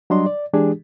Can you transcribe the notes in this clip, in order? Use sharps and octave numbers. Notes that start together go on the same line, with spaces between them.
F#3 G3 D4 D#5 C6
D5
E3 G#3 D4 G4 G#4